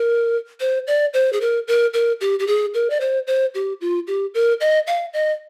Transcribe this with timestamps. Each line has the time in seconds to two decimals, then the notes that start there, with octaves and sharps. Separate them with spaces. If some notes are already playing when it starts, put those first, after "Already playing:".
Already playing: A#4
0.60 C5
0.87 D5
1.14 C5
1.33 G#4
1.41 A#4
1.68 A#4
1.94 A#4
2.21 G4
2.39 G4
2.47 G#4
2.74 A#4
2.90 D5
3.01 C5
3.27 C5
3.55 G4
3.81 F4
4.07 G4
4.34 A#4
4.61 D#5
4.87 F5
5.13 D#5